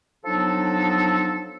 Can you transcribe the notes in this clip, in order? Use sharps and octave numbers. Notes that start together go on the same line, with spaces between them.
F3 F#3 B3 D4 D#4 A4